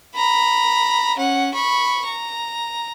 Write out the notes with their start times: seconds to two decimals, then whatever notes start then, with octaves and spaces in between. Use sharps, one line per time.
0.16 A#5 B5
1.18 C#4 F#5
1.54 B5 C#6
2.06 A#5